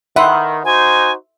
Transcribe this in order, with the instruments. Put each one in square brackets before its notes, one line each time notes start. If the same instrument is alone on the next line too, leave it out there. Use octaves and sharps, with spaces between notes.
[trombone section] D#3 [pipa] B4 F#5 [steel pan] E5 C6
[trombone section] D#4 F#4 C5 [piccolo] G#5